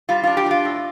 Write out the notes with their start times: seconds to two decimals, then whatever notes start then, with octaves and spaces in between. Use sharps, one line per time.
0.09 G3 F4
0.23 D4 F4
0.37 G4
0.46 D4 F4
0.65 A2